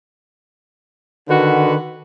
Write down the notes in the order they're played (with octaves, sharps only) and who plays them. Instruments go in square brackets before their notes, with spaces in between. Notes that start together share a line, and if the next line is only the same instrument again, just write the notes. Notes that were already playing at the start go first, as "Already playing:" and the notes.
[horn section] D3 D#3 F#4 B4